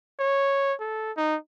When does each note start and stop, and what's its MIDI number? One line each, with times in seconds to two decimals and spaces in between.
0.19 0.74 73
0.80 1.12 69
1.17 1.37 63